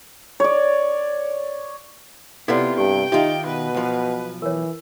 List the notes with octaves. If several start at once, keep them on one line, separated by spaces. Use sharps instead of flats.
C#5 D5
C3 B3 E4 F4 A4 D5
G2 G4 G5
D#3 D#4 F4 G4 E5
B2 B4
B1 F3
E3 A#4 C#5